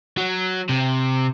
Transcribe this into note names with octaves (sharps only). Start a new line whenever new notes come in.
F#3
C3